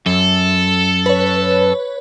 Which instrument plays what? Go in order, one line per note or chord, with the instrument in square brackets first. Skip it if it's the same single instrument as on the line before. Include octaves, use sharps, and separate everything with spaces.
[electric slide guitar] F#2 [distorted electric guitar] A4
[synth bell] B4 C#5